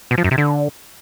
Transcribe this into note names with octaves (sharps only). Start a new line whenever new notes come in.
B2
F3
F#2
C3
D3